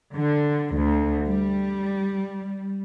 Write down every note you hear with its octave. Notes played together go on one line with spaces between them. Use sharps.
D3
D2
G3